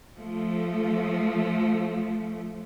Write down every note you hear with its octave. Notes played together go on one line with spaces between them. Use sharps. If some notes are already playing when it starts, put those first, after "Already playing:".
F3 A3